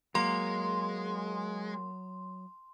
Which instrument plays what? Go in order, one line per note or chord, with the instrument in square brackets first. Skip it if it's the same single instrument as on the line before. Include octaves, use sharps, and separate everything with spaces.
[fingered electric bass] F#3 [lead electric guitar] G#3 [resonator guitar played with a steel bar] A#3 [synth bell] C6